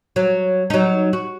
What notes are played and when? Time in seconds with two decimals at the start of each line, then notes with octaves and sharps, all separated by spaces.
0.16 F#3
0.70 F#3 D#4
1.13 F#4